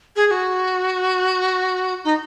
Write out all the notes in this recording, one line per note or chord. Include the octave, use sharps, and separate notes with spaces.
G#4
G#4
F#4
D#4